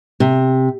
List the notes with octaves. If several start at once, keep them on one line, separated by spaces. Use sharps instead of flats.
C3